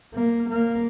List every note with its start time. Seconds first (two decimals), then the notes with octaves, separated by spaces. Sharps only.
0.15 A#3
0.49 A#3